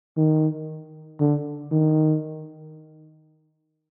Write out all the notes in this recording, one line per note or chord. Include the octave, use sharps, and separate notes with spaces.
D#3
D3
D#3